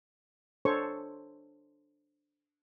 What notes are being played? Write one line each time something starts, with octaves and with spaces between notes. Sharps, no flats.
D4 A4 C5 C#5 C#6